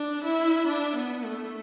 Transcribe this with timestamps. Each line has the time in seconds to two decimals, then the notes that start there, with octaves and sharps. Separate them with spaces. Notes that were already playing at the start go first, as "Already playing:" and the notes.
Already playing: D4
0.24 E4
0.67 D4
0.95 B3
1.25 A3